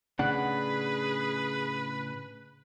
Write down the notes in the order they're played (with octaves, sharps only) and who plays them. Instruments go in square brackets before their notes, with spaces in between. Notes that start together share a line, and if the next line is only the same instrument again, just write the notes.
[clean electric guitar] A2 C#3 D4 [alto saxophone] G#4 [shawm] B4 [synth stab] F#5 F#6